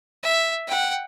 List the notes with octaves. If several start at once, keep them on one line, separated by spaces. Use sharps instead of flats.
E5
F#5 G5